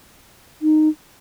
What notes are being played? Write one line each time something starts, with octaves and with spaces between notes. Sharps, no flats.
D#4